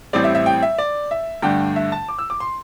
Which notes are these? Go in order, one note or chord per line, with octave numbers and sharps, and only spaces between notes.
A1 A2 G3 C4 D5
E5
E5
G5
E5
D5
E5
G2 D3 A3 D4 G5
E5
A5
D6
E6
D6
C6